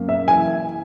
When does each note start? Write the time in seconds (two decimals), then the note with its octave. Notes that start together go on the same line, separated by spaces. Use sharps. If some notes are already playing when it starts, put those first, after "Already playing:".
Already playing: F#2 A#3
0.09 E5
0.28 E3 G#5